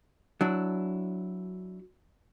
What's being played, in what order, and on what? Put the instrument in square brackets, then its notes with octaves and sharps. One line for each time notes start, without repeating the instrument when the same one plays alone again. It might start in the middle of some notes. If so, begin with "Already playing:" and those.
[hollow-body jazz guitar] F#3 D4 E4